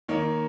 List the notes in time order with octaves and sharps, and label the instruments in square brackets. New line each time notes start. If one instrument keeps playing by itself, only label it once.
[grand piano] D#3 A#3 D#4 C#5